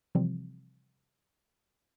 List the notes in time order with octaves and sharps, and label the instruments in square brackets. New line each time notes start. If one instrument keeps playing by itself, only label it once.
[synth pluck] C3 E3 F3 G3 C4